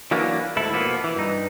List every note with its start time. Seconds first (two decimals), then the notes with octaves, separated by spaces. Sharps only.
0.11 E3 F#3 A#3 B3 D4
0.56 D2 G#2 E4 A4
0.73 B2 F3 A#3 B3
1.04 E3
1.16 G2 D#4